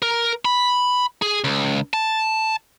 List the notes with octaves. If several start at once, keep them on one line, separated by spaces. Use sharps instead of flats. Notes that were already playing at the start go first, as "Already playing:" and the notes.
A#4
B5
G#4
C#2
A5